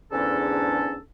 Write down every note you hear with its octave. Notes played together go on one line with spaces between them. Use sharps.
E2 G#2 D3 C#4 D4 A4